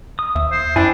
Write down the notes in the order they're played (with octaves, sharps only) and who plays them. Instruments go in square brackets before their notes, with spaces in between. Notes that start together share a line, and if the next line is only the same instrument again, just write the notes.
[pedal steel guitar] D#6
[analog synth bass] D#2 [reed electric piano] E5
[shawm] C5
[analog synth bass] F#2 [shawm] D4 [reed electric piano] E4 [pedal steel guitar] C5 G5 G#5